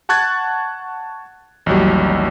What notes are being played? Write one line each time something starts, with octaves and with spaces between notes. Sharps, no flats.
F#5 A5 C#6 F#6 G#6 A6
A1 D#2 F#3 G3